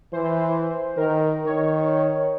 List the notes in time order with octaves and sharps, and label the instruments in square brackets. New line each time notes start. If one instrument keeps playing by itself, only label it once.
[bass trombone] E3 [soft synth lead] C5
[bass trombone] D#3 [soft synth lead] A#4
[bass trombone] D#3 [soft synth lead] C#5